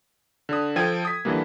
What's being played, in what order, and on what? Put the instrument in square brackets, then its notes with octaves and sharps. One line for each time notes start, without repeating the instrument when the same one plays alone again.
[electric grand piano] D3 D#6
F3 A4 G5 G#6 D#7
D#6 B6
D3 E3 G3 A#3